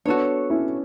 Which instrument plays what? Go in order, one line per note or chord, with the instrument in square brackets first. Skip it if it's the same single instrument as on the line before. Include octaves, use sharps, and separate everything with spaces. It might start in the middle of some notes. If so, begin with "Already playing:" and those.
[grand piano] B3 D4 [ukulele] F#4 A4 C#5
[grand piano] C#4 E4